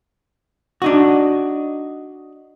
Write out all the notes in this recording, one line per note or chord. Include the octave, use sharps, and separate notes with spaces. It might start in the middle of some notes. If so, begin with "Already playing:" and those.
D4 D#4 F#4